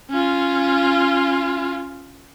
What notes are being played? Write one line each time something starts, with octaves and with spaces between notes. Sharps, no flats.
C#4 F4